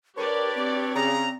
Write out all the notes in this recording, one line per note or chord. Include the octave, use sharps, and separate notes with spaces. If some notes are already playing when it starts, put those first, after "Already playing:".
D4 G4 A#4 B4 C#5 D5
C4
C#3 A#5